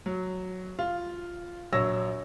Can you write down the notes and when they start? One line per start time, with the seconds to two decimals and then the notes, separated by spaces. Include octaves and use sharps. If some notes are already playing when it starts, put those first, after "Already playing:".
0.06 F#3
0.79 F4
1.72 A#1 F#3 C#5 E6 A#6